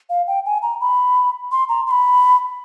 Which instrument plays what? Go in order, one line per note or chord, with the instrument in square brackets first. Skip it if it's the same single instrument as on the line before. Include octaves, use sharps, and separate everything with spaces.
[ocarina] F5
G5
G#5
A#5
B5
C6
A#5
C6
B5